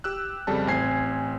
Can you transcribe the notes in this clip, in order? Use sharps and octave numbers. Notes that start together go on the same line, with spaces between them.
G4 E6 F#6
F2 C#3 G3 A4 A5
A1 C4 G#5 G#6 C7